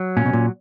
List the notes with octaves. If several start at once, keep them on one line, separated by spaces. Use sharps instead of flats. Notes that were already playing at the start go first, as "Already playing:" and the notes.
Already playing: F#3
A#2 C#4
B2
A#2